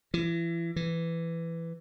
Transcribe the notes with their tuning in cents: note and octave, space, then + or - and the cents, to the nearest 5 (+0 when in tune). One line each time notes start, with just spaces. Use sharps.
E3 +30
E3 +10